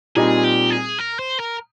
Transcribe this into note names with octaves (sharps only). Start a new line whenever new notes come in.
A#2 G3 C4 D#4 G#4
G4
G#4
A#4
C5
A#4